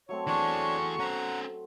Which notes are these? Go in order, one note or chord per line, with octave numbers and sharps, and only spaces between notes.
F#3 A3 C4 C#5
E3 D4 G#4 C#5 C#6
C#4 C5 F#5 A#5